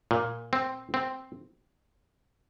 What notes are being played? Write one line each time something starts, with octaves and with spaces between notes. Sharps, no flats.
A#2
C4
C4